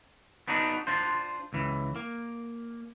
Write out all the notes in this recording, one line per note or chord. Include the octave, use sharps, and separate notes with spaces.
B3 D4 D#4 F#4
D4 F4 C5
C#2 E3
A#3